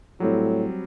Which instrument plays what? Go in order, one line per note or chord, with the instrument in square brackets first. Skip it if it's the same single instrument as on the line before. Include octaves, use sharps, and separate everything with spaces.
[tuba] A2 [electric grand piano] F#3 G3 C4